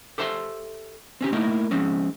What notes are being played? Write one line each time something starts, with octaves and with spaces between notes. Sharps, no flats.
G4 A4 C5 E5 A5 C6
C4 C#4 G4
A3 A#3 D#4 E4 A#4
F3 G#3 C4 C#4